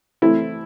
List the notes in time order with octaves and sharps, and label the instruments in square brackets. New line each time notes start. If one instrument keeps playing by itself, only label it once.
[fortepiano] E3 A3 C4 E4